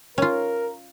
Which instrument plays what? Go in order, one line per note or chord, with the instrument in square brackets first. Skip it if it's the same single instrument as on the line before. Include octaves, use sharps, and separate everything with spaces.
[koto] C#4 F4 [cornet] A#4